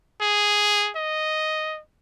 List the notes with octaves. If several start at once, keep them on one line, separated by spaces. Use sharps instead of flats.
G#4
D#5